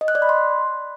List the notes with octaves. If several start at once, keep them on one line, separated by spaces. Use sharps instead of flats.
D#5
F#6
D5
B5
C6